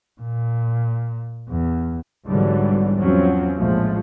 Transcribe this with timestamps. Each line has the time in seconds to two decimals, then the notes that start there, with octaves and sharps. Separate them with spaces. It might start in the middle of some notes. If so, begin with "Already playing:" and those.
0.21 A#2
1.49 E2
2.28 B1 G#2 D3 E3 F#3 G3
3.00 E2 F3 F#3 C4 C#4
3.57 A#1 A2 F3 G#3 A3